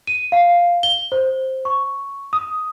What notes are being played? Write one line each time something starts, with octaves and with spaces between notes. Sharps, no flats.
D#7
F5
G7
C5
C#6
D#6